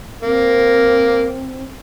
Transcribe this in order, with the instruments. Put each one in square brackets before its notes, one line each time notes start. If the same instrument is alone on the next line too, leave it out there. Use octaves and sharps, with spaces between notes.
[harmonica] A#3 [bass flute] C4